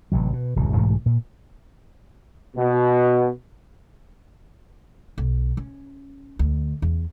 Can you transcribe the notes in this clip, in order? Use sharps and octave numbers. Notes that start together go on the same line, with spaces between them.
A1 C3 F#3
B2
D1 C2 F#2 C#3
B1 G#2 E3 A3
A#2
B2
B1
C#4
D2
E2